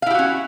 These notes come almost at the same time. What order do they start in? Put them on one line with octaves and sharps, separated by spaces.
F5 E4 G4 F#4 C#4